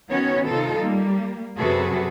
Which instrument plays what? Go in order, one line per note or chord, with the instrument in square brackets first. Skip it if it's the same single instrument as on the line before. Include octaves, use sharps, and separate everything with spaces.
[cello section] D#3 B3 C#4 F#4 C#5
C3 D#4 F4 A4
G3 A#3
F#2 C3 F#4 G#4 A4 B4